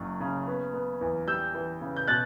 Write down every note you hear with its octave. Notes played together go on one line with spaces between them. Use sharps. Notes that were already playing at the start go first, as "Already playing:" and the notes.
Already playing: F#1 F#2
C#3
B3
B3
E2
G3 E6 G6
E3
C#3
G6
B2 F#6 A6